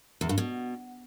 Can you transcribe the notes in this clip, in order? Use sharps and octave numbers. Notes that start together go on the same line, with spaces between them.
E2
G2
B2